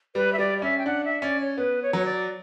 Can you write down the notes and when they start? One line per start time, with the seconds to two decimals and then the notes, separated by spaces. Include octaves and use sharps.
0.15 G3 B4
0.32 E5
0.38 G3 D5
0.57 D5
0.62 C#4 E5
0.78 G5
0.86 D4 F#5
1.04 E5
1.21 C#4 D5
1.40 C#5
1.57 B3 B4
1.82 C#5
1.93 F#3 C#5
2.05 D5